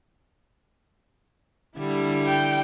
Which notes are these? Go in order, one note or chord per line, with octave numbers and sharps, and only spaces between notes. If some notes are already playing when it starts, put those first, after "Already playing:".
D3 G3 E4
G5